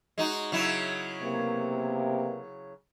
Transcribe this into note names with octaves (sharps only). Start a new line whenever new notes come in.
G#3 D#4 F#4
C#3 F#3 E4
C3 A#3 B3